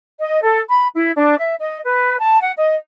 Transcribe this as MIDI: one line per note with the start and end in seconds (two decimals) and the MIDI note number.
0.19 0.40 75
0.43 0.60 69
0.69 0.87 83
0.95 1.12 64
1.16 1.36 62
1.38 1.55 76
1.60 1.80 75
1.84 2.17 71
2.19 2.39 81
2.41 2.52 78
2.57 2.75 75